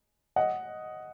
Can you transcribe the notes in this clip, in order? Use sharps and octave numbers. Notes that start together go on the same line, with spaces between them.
D#5 F#5